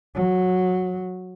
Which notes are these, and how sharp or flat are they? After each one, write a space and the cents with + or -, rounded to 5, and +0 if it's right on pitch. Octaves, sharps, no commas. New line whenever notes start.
F#3 -10